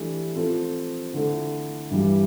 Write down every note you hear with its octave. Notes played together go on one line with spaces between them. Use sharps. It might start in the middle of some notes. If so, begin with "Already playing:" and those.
Already playing: E3 A3 D4 G4
F3 C4 F4 A4
D3 A3 E4 A4
G2 E3 G3